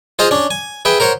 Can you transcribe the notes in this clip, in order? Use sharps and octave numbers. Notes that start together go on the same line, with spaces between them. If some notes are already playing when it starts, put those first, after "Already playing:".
F4 G#4 C5 D#5 F5
C#4 D4
G#5
G#4 B4 E5 G5
A#4 C5 C#5 F#5